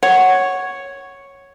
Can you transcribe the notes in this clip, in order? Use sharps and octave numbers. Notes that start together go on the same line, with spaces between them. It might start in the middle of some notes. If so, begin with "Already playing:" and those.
C#5 F#5